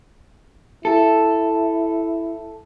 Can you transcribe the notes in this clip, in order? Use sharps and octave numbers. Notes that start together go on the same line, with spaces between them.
E4 A4